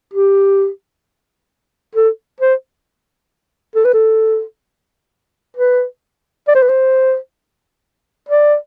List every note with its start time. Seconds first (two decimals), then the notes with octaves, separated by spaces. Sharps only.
0.14 G4
1.95 A4
2.40 C5
3.75 A4
3.85 B4
3.94 A4
5.56 B4
6.48 D5
6.55 C5
6.62 B4
6.69 C5
8.29 D5